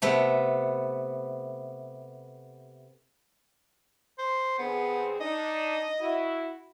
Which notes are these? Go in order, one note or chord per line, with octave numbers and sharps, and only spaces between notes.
C3 A3 B3
C5
D3 B3 C4 G#4
D4 D#4 D#5
E4 F#4